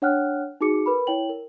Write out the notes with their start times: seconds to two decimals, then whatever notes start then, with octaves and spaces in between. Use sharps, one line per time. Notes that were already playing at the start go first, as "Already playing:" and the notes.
0.02 D4 C#5 F#5 G5 F6 F#6
0.61 D#4 F#4 G#4 D6 C#7
0.86 A#4 B4 B5
1.07 E4 C#5 G5 F#7
1.29 A#4